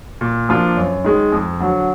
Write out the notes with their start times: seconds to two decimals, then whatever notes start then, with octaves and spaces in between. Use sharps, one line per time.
0.21 A#2
0.49 F3 A#3 D4 F4
0.77 F#2
1.04 D#3 G#3
1.32 F2
1.60 D3 F#3